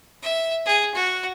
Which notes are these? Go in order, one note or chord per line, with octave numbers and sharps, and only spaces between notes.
E5
G#4
F#4